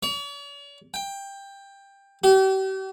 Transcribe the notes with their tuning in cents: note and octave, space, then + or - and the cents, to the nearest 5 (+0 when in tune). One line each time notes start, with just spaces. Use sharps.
C#5 +45
G5 +15
G4 -40